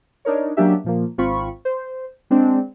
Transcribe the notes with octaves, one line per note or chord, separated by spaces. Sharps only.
D4 D#4 A#4 C#5
F#3 A#3 C#4 D4 G4 E5
A#2 F3 A#3
G#1 C4 F4 B5 C#6
C5
G#3 C4 D4